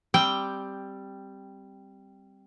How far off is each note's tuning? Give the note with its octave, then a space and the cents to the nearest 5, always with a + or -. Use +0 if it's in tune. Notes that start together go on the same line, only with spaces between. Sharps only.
G3 +0 C4 +5 G5 +0